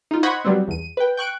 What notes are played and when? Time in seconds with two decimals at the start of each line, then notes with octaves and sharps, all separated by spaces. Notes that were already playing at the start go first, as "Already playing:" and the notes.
0.11 D#4 F4
0.23 C5 D#5 F#5 B5 C#6 G#6
0.45 F#3 G3 B3 C4
0.68 E2 D#7
0.97 B4 G5
1.17 G5 C#6 F#6 D7